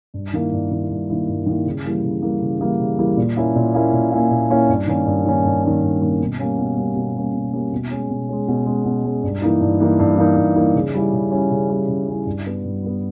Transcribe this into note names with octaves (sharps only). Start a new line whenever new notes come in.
G2
D#3 A#3 E4
G2
D#3 A#3 E4
G2
D#3 A#3 E4
G2
D#3 A#3 E4
C#3
E3 G3 A#3
C#3
E3 G3 A#3
C#3
E3 G3 A#3
C#3
E3 G3 A#3
A#2
A#3 C#4 E4
A#2
A#3 C#4 E4
A#2
A#3 C#4 E4
A#2
A#3 C#4 E4
G2
D#3 A#3 C#4
G2
D#3 A#3 C#4
G2
D#3 A#3 C#4
G2
D#3 A#3 C#4
B2
G3 A#3 C#4
B2
G3 A#3 C#4
B2
G3 A#3 C#4
B2
G3 A#3 C#4
B2
G#3 C#4
B2
G#3 C#4
B2
G#3 C#4
B2
G#3 C#4
G2
E3 A#3 D#4
G2
E3 A#3 D#4
G2
E3 A#3 D#4
G2
E3 A#3 D#4
C#3
G3 C#4 E4
C#3
G3 C#4 E4
C#3
G3 C#4 E4
C#3
G3 C#4 E4
G2
G3 B3
G2
G3 B3